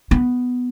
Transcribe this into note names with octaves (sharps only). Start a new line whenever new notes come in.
B3